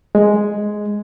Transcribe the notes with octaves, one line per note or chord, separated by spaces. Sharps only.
G#3